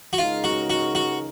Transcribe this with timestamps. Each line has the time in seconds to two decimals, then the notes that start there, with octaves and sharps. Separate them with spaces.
0.13 F#4
0.18 C#2 C#3 G#3 D#4 F4 A#4
0.44 F#4
0.70 F#4
0.95 F#4